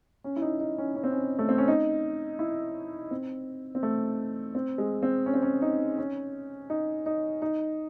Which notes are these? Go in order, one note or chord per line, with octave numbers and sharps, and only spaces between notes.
C#4
E4
D#4
D#4
C#4
C#4
C4
C#4
A3
C4
C#4
D#4
E4
C4
C4
A3
C4
G#3
C4
C#4
C4
C#4
D#4
C#4
D#4
D#4
D#4